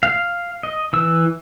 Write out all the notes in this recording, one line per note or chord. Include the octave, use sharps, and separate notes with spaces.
F5
D#5
E3 E6